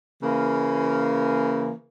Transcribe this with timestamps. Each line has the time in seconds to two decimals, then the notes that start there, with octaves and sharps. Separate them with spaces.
0.22 C#3 E3 A#3